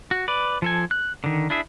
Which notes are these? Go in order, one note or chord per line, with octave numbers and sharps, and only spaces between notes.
F#4
B4 D5
F3 A4 G#5
F#6
D3 D#3
D4 E4 G#4 E5